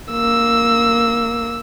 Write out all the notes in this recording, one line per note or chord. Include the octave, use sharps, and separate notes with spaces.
A#3 E6